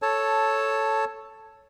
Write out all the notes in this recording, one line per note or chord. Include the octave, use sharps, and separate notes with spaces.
A4 C#5 A5